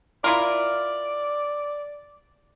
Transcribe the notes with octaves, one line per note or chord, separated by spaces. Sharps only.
E4 F4 A#4 D5